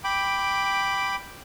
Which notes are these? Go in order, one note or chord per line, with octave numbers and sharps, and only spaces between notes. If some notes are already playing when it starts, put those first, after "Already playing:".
G5 B5 D6